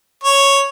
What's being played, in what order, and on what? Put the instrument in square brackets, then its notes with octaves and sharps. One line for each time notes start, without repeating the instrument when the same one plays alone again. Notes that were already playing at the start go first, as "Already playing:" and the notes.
[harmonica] C#5